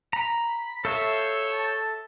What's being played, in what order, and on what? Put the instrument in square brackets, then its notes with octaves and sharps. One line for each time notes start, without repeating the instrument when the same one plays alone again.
[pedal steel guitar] A#5 [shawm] B5
[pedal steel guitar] A4 E5 [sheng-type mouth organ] C#5 E6 G6 [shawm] F5
[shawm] A5